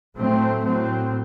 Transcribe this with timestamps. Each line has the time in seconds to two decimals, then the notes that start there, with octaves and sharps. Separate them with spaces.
0.16 A2 F#3 A3 C4
0.64 A2 F#3 C4